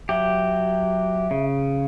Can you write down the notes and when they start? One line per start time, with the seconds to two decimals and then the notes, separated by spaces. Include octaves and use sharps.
0.09 F#3 G4 E5
1.31 C#3